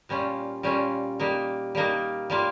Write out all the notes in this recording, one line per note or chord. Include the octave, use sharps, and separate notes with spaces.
A#2 G3 C#4 F4
A#2 G3 C#4 F4
G3 A#3 D#4
G3 A#3 D#4
G3 A#3 F4